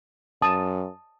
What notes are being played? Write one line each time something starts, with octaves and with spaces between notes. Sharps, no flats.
F#2 A5 D#6